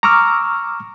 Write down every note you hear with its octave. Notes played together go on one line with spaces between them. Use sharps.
A#5 C#6 D6 E6 F6